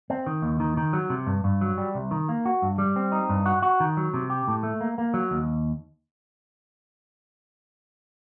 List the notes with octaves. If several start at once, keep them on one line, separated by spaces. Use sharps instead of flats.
C4
D#3
D#2
D#3
D#3
F#3
C3
G2
G2
F#3
G3
C2
D#3
A#3
F#4
G2
G3
C4
D#4
G2
F#4
F#4
D#3
F#3
C3
G4
A2
A3
A#3
A#3
F#3
D#2